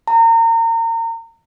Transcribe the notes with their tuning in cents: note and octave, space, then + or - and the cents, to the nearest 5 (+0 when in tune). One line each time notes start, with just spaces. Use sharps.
A#5 -30